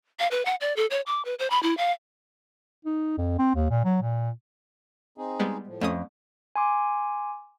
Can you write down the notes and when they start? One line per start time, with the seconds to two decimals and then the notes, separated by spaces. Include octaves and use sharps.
0.19 F5
0.31 B4
0.45 F#5
0.60 D5
0.76 A4
0.90 C#5
1.06 D6
1.25 B4
1.39 C5
1.50 B5
1.63 E4
1.77 F5
2.85 D#4
3.17 F2
3.39 C4
3.55 D#2
3.70 A#2
3.85 F#3
4.02 A#2
5.18 C4 D#4 G#4
5.39 G3 G#3 B3
5.67 A2 F3
5.81 F2 A3 C#4 D#6
6.56 G#5 C6 D6